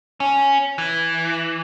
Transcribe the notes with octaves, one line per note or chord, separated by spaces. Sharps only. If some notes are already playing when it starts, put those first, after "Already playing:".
C#4
E3